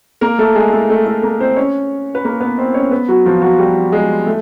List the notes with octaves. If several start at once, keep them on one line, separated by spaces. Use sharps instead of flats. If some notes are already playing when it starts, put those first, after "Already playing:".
A#3 A#4
A3 A4
G#3 G#4
A3 A4
A3 A4
A3 A4
A#3 A#4
C4 C5
C#4 C#5
B4
A#3 A#4
B3 B4
C4 C5
C#4 C#5
B3 B4
F#3 F#4
F3 F4
F#3 F#4
G3 G4
G#3 G#4
A3